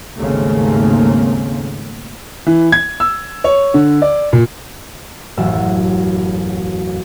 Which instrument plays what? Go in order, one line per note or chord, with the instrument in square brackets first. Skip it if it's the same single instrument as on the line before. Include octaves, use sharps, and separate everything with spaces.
[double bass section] G#1 D#2 C#3 A3 A#3 C4
[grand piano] E3
G#6
E6
C#5
D3
D5
A#2
[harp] E1 A1 F#2 E5